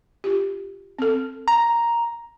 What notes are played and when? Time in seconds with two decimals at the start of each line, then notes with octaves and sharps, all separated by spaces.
0.24 F4 G4
0.99 C4 A4
1.48 A#5